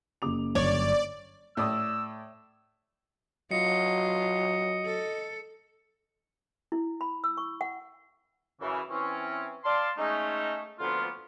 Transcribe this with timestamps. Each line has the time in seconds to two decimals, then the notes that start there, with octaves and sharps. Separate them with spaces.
0.22 F#1 D6 F7
0.55 G1 G2 F#3 C#5 D5
1.57 A2 D5 D#6 E6
3.51 F#3 F4 D#5 C#7
4.85 A4
6.72 E4
7.01 B5
7.24 E6
7.37 C#6
7.61 F#5
8.61 F#2 C#3 E3
8.90 E3 C4 C#4
9.64 D5 F5 A5 C6
9.98 G#3 A3 C#4 D#4
10.79 D2 F3 A#3 B3 C#4 F4